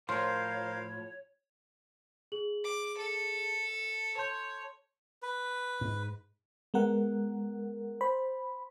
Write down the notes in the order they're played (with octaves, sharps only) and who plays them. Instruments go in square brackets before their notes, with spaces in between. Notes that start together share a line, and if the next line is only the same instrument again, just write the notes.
[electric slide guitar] A2 F3 [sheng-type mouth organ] A#4 C5 F5 [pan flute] C#5 [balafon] C6
[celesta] G#4 F#7
[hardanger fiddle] D6
A4
[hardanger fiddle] C#5 [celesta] A5 C6 G6
[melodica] B4
[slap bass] G#2
[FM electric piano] G#3 B3 A#4 F#5
C5 B5